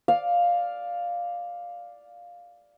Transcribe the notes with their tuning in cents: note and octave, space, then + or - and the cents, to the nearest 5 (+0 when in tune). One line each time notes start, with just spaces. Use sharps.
D5 +0 F5 +5